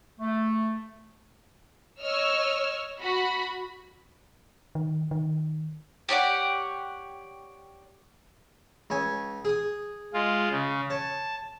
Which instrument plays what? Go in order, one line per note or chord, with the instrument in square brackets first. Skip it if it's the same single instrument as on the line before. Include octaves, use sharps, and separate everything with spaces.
[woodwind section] A3
[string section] C#5 D#5 E6 F6
F#4 B5
[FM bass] D#3
D#3
[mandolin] G4 C#5 D5 F#5
[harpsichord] C#2 C#5 G#5
G#4 D#6
[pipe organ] G#3 F4
C#3
[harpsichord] C#5 [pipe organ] A5